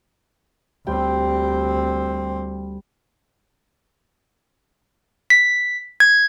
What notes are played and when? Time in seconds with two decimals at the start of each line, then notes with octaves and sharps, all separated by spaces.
0.87 D2 G3 C4 G5 G#5
5.30 B6
6.00 G#6